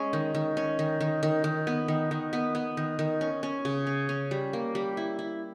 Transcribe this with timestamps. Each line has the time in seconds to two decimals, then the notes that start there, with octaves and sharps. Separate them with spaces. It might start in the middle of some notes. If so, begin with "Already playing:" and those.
Already playing: G#3 C#4
0.13 D#3
0.35 D#3
0.57 C#4
0.79 D#3
1.01 D#3
1.23 D#3
1.44 D#3
1.67 B3
1.88 D#3
2.11 D#3
2.33 B3
2.55 B3
2.77 D#3
2.99 D#3
3.21 C#4
3.43 C#4
3.65 C#3
3.87 C#4
4.09 C#4
4.31 G3
4.53 A#3
4.75 G3
4.97 E4
5.19 E4